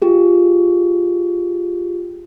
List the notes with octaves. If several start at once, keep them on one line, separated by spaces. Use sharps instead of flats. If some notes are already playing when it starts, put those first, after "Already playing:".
F4 G4 G#4